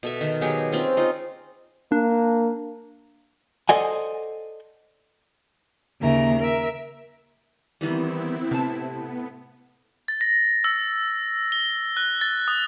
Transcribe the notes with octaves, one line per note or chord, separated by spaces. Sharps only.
B2 A4 E5
D#3
F#3 B3 G4 G#4
C4 C#4 F4
D#4 F4
A#3 D4
A4 C5 D5 D#5 F#5 G#5
D#2 C#3 A#3 E5 A#5
A#4 E5
D#3 E3 G3 B3 C4 E4
A2 C3 A5
B3
A6
A#6
E6
G7
F#6
A6
D#6